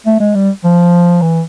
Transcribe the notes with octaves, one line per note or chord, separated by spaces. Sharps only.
A3
G#3
G3
F3
E3